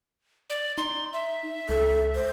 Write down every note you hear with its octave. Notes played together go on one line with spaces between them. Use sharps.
D5
D#4 C6
E5
C#2 A4
C5